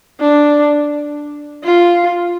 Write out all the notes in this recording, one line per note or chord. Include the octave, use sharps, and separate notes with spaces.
D4
F4